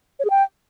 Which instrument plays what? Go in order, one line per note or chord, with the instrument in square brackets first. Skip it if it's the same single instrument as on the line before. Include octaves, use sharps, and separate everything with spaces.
[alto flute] C#5
G#4
G5